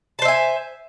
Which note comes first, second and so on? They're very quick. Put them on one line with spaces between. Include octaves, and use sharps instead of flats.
A5 C5 E5 G#5